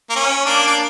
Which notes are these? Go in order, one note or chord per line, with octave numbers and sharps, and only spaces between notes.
A#3
C#4
A#3 D4
D4